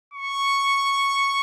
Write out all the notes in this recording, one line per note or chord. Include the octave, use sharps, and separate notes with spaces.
C#6